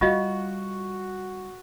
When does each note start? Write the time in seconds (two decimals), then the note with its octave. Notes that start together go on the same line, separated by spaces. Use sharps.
0.01 G3 F4 F#4 D#5 F5